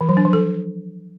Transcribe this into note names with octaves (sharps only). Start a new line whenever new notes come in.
E3
F#3
D4
F3
A4